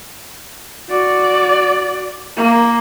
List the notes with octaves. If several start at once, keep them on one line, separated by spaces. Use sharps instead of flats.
F#4 D5
A#3